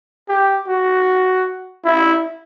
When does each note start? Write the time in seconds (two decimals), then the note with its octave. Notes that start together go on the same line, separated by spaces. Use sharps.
0.29 G4
0.68 F#4
1.85 E4